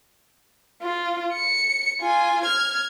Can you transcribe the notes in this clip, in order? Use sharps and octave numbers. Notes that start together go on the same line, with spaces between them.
F4
C#7
F4 G#5
F6 G#6